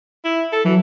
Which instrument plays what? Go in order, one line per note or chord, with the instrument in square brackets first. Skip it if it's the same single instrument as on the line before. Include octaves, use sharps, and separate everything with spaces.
[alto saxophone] E4
A4
[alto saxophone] E3 [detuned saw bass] F#3